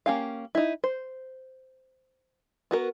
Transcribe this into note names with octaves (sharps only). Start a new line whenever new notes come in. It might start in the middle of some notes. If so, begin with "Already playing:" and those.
A#3 C#4 G4 F5
D#4 E4
C5
B3 F#4 A#4